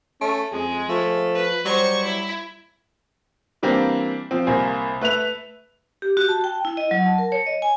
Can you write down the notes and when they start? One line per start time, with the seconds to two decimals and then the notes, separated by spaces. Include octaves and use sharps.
0.21 A3 C#4
0.52 F2 G#3 G#4
0.89 F3 A3
1.35 B4
1.65 F#3 G3 C5 C#6
2.04 E4
3.63 E3 G3 A#3 C4 D4
4.31 F3 C4
4.47 C2 A#3 C5 G#5
5.01 A3 B4 E5 F7
6.02 G4
6.17 F#4
6.29 A5
6.44 G5
6.65 E4
6.77 D#5
6.91 F#3
7.06 A5
7.18 A#4
7.32 C#5
7.47 D#5
7.62 G#5